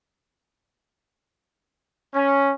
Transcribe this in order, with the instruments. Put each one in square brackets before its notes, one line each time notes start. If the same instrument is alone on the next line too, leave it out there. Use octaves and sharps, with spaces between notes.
[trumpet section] C#4